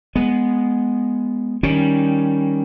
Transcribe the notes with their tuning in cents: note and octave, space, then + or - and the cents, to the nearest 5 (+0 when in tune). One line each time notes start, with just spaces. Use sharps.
G#3 +0 B3 +0
D#3 +0 G3 +0 C#4 +0